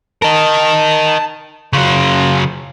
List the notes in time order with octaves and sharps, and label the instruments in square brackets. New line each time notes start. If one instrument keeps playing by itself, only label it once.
[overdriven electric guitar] A#4 D#5 [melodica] A5
[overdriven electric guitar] C#3 F#3 [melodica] F4